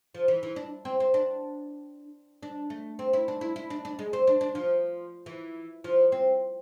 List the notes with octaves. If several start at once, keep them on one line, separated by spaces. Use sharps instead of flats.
F3
E3
E3
D4
C4
C4
D4
D4
A3
C4
E4
D4
E4
E4
D4
D4
G#3
C4
D4
D4
F3
E3
F3
C4